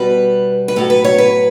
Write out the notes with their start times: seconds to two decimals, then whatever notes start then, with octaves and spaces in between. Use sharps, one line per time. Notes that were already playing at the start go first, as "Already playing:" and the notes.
Already playing: B2 G3 B4
0.68 B4
0.76 A2 F#3 A4
0.90 B4
1.04 C#5
1.18 B4